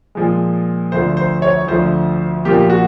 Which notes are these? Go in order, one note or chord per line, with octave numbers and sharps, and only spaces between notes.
A#2 F3 G#3
D2 D3 F3 C5
C5
C#5
D2 D3 F3 C5
A#2 F3 A#3 G4
F#4